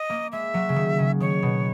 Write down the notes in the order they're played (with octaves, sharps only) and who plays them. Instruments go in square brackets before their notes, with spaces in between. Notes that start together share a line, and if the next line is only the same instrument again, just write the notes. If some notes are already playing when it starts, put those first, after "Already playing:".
Already playing: [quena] D#5
[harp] A#3
[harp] G#3 [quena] E5
[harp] F#3
C#3
D#3
C#3
[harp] D#3 [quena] C#5
[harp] B2